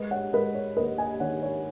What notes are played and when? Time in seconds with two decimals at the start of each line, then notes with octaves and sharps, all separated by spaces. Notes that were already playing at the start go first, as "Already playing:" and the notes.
Already playing: G#3 B4 D#5
0.11 C#5 F#5
0.33 G#3 B4 D#5
0.55 C#5
0.77 D#2 B4 D#5
0.98 D#5 G#5
1.20 D#3 C#5 F#5
1.43 C#5